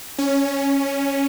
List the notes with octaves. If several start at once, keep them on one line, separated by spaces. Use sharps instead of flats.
C#4